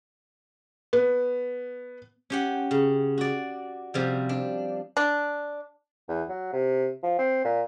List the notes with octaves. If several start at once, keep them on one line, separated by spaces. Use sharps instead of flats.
B3
C#4 G4 F#5
C#3
F#4 D5
C3 F3 G3
D4
D4
E2
F#3
C3
F3
C4
A#2